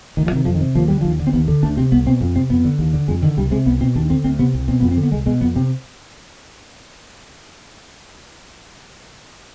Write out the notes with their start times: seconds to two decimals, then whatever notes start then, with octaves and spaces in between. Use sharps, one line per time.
0.17 D2 D#3
0.27 F3
0.32 C3 D#3
0.45 F2 F3
0.54 D#3
0.61 C3
0.75 D#2 F3
0.88 D3 G3
1.01 D#2 F3
1.19 D3
1.27 C4
1.33 D#2 B3
1.48 D3
1.63 D2 D4
1.77 C3 C4
1.92 C2 B3
2.06 B2 C4
2.21 F2
2.36 C3 C4
2.50 F2 B3
2.65 D3
2.79 D#2
2.94 D3
3.08 F2 G#3
3.22 D3 D#3
3.37 C2 G3
3.51 C3 G#3
3.66 C2 B3
3.81 B2 C4
3.95 D#2 D4
4.10 D3 C4
4.24 D2 C4
4.39 C3 B3
4.54 C2
4.68 B2 C4
4.80 F2 B3
4.91 C4
4.97 D3
5.03 B3
5.12 C2 G#3
5.26 B2 G#3
5.41 F2 B3
5.55 C3 C4